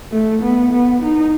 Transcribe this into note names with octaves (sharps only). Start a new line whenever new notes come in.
A3
B3
B3
D#4